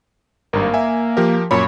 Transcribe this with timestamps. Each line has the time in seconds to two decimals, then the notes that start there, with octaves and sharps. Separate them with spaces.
0.53 G#1 G2 A#3
0.74 E5 G#5
1.17 F3 G4 A#4
1.51 F#2 A#2 C#5 B5